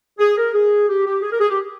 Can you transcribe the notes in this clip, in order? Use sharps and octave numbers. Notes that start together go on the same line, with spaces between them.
G#4
A#4
G#4
G4
G4
G#4
A#4
G#4
G4